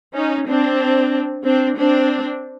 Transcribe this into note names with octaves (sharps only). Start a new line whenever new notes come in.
C#4 D#4
C4 D4
C4 D4
C4 D4